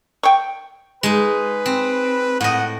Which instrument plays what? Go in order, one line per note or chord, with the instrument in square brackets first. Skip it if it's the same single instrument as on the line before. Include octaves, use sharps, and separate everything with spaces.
[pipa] G5 C#6
[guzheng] G#3 D#4 [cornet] B4
[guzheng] C4
[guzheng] A2 D#5 [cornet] F#5